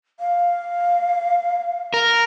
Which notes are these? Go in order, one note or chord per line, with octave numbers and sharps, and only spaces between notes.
F5
A#4